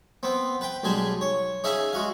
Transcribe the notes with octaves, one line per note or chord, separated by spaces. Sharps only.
B3 C4
B4 G5
B1 G3 G#3 G#5 A5
C#5
C#4 D#4 G#4 E5 F5 G#5
G#3 F#4 F5